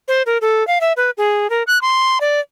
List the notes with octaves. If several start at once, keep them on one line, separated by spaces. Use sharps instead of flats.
C5
A#4
A4
F5
E5
B4
G#4
A#4
F#6
C6
D5